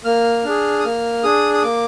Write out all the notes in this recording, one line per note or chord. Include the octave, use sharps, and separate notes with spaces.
A#3 F6
D4 G#4
D#6
A#3 F6
D4 G#4 D#6
D#6
A#3 D6